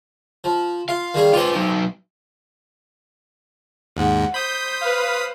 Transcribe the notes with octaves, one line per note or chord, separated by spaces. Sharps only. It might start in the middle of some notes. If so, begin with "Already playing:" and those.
F3
F4 F5
D#3 G3 G#4
F4 G4 B4 C5
F#3 D#4
D#2 G#2 F#5
C5 B5 D#6 G6
B4 F5